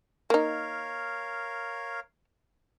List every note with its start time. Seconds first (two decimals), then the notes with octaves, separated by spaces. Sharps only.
0.30 A#3 D#4 A#4 C#5 F5